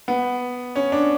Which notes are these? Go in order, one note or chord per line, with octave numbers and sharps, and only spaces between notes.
B3
C#4
D4